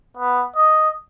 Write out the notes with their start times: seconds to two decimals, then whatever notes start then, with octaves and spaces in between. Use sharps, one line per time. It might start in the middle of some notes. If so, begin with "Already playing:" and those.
0.17 B3
0.56 D#5